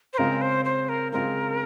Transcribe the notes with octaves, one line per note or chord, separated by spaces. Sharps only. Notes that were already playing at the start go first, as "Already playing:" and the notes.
C5
C#3 G#3 C4 F4 G#4 A#4
C5
C5
A#4
C#3 G#3 C4 F4 G#4 A#4